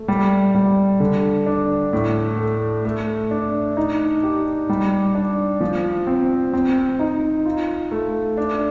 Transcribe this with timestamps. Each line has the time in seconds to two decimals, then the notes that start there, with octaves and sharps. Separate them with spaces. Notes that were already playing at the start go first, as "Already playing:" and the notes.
Already playing: A3
0.08 G3
0.55 G3
1.00 D3
1.46 D4
1.93 A2
2.38 A3
2.85 A3
3.31 D4
3.77 D#4
4.23 G4
4.69 G3
5.15 D4
5.60 F3
6.07 C4
6.53 C4
6.99 D#4
7.45 F4
7.91 A3
8.37 D4